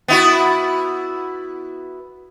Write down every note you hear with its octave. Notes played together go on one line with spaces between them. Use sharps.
B3 E4 F#4